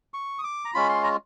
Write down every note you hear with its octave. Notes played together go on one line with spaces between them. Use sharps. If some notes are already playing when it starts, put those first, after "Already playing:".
C#6
D#6
D6
A#5
G#3 C#4 F4 B5
C6
A#5